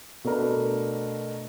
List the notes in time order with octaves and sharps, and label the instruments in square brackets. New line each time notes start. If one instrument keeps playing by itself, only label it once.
[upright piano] B2 A3 D4 A#4 B4